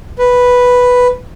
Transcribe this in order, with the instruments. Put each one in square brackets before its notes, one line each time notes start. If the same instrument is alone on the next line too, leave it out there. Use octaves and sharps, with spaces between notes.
[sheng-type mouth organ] B4